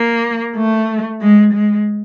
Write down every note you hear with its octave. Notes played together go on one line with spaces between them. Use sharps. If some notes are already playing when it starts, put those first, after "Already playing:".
Already playing: A#3
A3
G#3
G#3